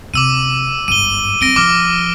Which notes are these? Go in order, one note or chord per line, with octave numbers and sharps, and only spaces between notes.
C3 D6 E6 D#7
G1 G#2 D#7 G7
F#3 C4 A#6 D7 G7
F3 D6 F6